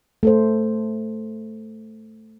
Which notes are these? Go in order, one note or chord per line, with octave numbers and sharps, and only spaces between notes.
A3 A4 C5